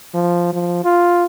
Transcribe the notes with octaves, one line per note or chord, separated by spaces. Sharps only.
F3
F3
F4